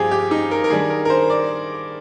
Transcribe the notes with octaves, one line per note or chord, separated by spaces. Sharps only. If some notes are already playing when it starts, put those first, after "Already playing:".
Already playing: G2 F3 C4 F4 G4 G#4
G4
D#4
A#4
A#4
D#3 G3 D4 G#4
A#4
A#4
C5
D5